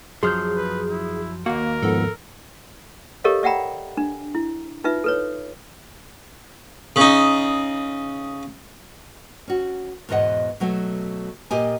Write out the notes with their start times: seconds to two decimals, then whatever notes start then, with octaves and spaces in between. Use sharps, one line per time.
0.23 F#2 F3 F#3 G#4 C6 F6 G6
0.56 B4
0.90 E4
1.46 D#2 A#3 F#4 A#4
1.83 G#2 F3 B3 A4
3.24 G4 A4 A#4 C#5 D#5 F5
3.43 D5 E5 F#5 G5 A#5 B5
3.97 D4
4.35 E4
4.84 D#4 F4 B4 E5
5.04 A4 B4 C#5
6.96 C#3 D#4
9.48 C#4 F#4
10.09 E2 G#2 B2 D#5 F#5
10.60 B2 F#3 A3
11.51 A#2 G4 D#5 G#5